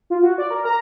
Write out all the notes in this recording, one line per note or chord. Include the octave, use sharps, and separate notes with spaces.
F4
F#4
D5
A#4
A#5